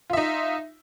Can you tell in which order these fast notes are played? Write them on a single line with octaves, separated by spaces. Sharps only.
F4 E5 D#4